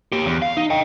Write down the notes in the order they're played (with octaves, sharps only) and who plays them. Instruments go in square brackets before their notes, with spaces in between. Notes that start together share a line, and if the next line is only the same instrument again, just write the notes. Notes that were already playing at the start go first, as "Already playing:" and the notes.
[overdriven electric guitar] A#3 G4
E2
F5
D#4
D#5 G5